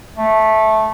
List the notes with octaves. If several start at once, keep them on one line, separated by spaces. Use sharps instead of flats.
A3